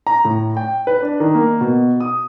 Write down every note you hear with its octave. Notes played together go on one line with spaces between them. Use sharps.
A#5
A2
G5
B4
D4
D#3
A#3
B2
D#6